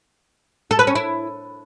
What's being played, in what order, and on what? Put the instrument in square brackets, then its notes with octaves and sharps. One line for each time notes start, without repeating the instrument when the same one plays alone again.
[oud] A4
B4
C#4
E4